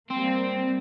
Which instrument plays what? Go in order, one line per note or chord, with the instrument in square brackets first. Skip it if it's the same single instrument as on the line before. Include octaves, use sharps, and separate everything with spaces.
[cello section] G3 A#3 [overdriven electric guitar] C4